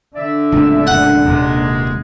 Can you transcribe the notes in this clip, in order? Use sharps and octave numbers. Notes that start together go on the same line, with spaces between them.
D3 D5 E5
D1 C#2 D4
F#5
D#1 D#2 C3 G#3